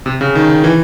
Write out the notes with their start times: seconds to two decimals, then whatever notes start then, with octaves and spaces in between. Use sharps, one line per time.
0.06 C3
0.21 C#3
0.35 D#3
0.64 E3